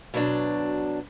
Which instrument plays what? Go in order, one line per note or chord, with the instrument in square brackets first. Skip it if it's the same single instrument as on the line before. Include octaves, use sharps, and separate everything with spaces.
[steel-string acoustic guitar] B2 F#3 D4